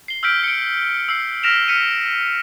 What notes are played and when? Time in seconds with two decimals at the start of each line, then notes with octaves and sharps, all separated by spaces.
0.08 C7 G7
0.23 E6 F6 G6 B6 D7
0.43 C#7 D7
1.09 E6 C7
1.43 F6 A#6 B6 D7 E7 F7
1.68 F6 B6 C#7 D#7